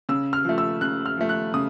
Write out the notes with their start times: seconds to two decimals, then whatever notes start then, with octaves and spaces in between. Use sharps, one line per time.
0.09 C#3 E6
0.33 F6
0.45 F3 A3
0.58 E6
0.81 C#3 F#6
1.06 F6
1.17 F3 A3
1.29 F#6
1.54 C#3 D#6